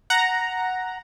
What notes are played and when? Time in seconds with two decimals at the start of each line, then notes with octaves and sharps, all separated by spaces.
0.10 F#5 A#5